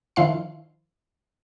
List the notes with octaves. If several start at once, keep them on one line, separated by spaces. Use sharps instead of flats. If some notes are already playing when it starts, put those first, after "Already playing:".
D#3 F3 E4 F5 C6 C7